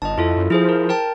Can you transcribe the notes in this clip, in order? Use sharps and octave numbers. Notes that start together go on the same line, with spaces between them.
G1 D#5 A5
F2 E4 F4 A4
F#2
F3 E4 G#4 C5
A#4
A#4 G5 A5